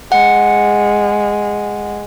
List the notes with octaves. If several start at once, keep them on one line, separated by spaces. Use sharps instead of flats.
G#3 F#5